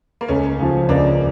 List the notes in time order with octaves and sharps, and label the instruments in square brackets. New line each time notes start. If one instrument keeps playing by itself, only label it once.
[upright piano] A#3
[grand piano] C#2 [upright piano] A3 C#4
[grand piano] C#3 F3
[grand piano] C#2 [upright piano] A#3 D4